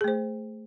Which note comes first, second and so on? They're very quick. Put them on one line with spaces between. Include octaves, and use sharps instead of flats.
G#4 A3 C5